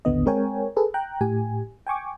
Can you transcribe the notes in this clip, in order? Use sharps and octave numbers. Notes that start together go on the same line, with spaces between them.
A1 D#2 D3 B3 D#5
G#3 C4 A#4 C#5 G5 G#5
G#4 A4 B4
G5 A#5 F#6
A2 G4 G#5
G5 G#5 C#6 D6